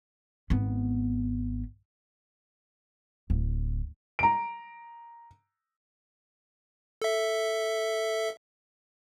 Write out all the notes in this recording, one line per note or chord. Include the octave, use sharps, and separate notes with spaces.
G#1 B3
D1
A#5 D7
A4 E5